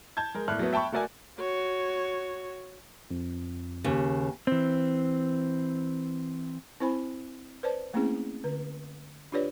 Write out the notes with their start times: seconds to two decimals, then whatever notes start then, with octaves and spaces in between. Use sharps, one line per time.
0.17 A5 G6 G#6
0.34 G#3 A#4
0.48 E1 A2 A4 D5 F6 F#6
0.59 F#3 A3 B3
0.73 E5 G5 A5 B5 C#6
0.92 A3 F#4 A#4 D5 E5 G#5
1.39 F#4 C#5
3.11 F2
3.84 D#2 C#3
4.47 E3 C4
6.80 C4 E4 C5 G#5 B5
7.63 B4 C5 D5 A5
7.94 A3 A#3 C4 C#4 E4 G#4
8.44 D3 B4
9.32 D4 F4 G4 B4 C#5 D5